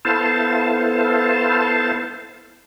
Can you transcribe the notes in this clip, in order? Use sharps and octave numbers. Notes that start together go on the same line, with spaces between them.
B3 E4 A4 C5 F5 A5